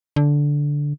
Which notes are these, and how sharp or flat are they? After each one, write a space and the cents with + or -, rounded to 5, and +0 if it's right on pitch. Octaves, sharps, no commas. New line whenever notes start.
D3 -10